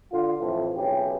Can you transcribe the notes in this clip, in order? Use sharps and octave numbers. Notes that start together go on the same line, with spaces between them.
D3 F4
F2 A2 E3
B1 C#3 G4